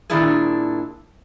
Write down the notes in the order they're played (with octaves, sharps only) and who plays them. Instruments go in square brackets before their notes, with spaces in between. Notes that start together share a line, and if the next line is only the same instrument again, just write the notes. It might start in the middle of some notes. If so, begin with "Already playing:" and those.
[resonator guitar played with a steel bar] A#2 D#3 D4 E4 G#4